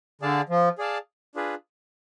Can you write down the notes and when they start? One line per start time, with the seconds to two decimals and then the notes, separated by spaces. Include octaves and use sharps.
0.21 D3 G#4 D5 F5 A5
0.49 F3
0.78 G#4 D5 F5 A5
1.35 D4 F4 G#4 B4